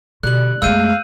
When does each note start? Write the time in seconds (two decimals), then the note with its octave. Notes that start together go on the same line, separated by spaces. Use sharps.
0.23 B2 D3 G3 F#6 F#7
0.62 F#2 G#3 A3 B3 F5 E6 G6 D#7